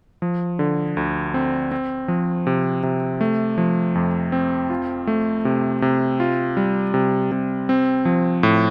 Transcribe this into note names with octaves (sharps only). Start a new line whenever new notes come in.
F3
D3
D2
C4
C4
F3
C3
C3
A3
F3
F2
C4
F4
A3
C3
C3
F4
G3
C3
C3
C4
F3
A2